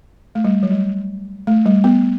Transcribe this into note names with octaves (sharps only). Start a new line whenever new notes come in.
A3
G3
F#3
G3
A3
G3
B3